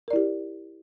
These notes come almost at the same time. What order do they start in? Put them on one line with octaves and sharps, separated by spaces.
A#4 D5 E4 G4